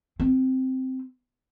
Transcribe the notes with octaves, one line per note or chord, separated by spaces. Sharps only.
C4